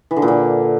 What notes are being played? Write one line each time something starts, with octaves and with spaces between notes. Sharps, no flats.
E3
D3
A#2
D3